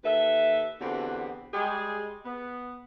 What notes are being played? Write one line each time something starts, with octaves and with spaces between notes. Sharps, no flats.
D#2 A4 B4 E5
E2 B2 D3 B3 C4 G4
G3 G#3 G#4
B3